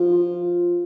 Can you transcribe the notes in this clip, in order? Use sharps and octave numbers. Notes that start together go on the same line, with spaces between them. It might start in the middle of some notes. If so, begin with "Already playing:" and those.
Already playing: F3